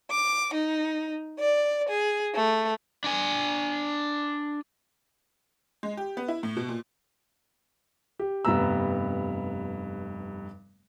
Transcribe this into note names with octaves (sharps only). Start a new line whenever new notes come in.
D6
D#4
D5
G#4
A3
D4 G#5
G#3
G4
B3
E4
A2
B2
A#2
G4
F1 G2 C3 B3 A#5 E6